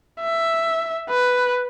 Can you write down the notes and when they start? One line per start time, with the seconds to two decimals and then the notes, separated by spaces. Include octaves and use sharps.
0.20 E5
1.10 B4